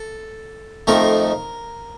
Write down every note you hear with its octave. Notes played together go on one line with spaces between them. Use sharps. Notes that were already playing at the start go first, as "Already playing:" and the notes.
Already playing: A4
F2 D#3 A3 A#4